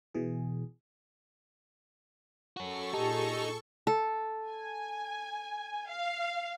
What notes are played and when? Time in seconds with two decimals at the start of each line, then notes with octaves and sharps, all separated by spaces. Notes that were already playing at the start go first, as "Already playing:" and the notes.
0.15 B2 E3 G#4
2.57 C#4 F#4 A4 C#6
2.94 A#2 D#4 G4 G#4 A5
3.87 A4
4.48 G#5
5.89 F5